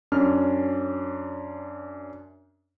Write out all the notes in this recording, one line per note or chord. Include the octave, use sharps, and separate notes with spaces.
F#2 C#4 D4 F6